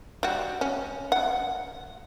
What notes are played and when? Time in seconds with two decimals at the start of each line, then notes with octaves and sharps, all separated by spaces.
0.23 G3 F#4
0.61 C#4
1.12 F#5